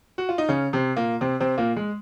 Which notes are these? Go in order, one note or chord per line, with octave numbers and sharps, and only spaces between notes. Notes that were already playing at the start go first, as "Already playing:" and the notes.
F#4
F4
D#4
C#3 C#4
C3 C4
A#2 A#3
C3 C4
C3 C4
A#2 A#3
G#3